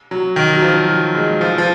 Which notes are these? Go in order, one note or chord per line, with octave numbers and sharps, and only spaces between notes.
F#3
D#3
F#3
F3
F#3
G#3
F3
F3